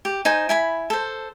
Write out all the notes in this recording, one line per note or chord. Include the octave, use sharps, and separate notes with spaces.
G4
D#4 C5 G#5
E4 G#5 B5
A4 C5